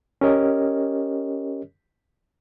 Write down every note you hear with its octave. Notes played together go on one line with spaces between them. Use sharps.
C#4 G4 A#4 C#5 D#5